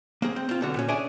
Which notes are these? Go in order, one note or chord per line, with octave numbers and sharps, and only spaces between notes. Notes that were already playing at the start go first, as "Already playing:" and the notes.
A#3 C4 G#4
C4
C4 F4
B1 D3 F#4
A#2 C#4
C#4 D4 G#4 D5 E5 G#5